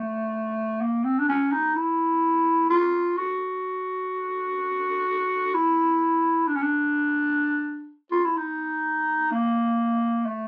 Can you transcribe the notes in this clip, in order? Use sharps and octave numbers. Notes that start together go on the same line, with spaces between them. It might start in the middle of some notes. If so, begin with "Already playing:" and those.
Already playing: A3
A#3
C4
D4
C#4
D#4
E4
F4
F#4
E4
D4
C#4
D4
F4
E4
D#4
A#3
A3